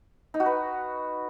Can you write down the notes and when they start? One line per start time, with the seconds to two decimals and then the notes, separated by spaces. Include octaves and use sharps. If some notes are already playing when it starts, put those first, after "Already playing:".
0.34 D#4
0.40 F#4
0.46 B4